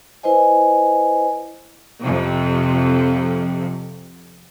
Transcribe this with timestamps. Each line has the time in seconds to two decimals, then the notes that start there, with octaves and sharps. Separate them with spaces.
0.23 E4 B4 C5 D#5 G#5
2.02 F2 C3